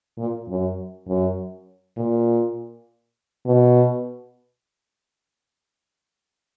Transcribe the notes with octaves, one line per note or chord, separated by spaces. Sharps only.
A#2
F#2
F#2
A#2
B2